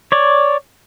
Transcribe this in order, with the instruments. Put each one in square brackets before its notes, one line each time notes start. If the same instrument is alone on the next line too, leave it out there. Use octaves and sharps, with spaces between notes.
[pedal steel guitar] C#5 D5